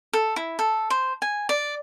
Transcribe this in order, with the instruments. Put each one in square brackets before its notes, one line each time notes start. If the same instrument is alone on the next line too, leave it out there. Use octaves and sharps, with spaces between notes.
[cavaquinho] A4
E4
A4
C5
G#5
D5